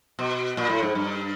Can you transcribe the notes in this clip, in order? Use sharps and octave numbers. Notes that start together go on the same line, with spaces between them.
B2
A#2
A2
G#2
G2